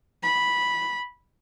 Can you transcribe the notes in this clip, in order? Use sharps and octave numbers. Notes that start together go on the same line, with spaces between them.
B5